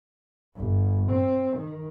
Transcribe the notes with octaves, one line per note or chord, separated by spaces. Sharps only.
G1
C4
D#3